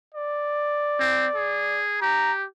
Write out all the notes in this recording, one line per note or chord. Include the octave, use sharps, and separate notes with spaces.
D5
C4
G#4
G4 A#5